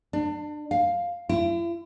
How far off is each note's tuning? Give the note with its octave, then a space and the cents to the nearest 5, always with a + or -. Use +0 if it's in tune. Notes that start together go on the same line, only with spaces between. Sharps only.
D4 +30
F5 +5
E4 +45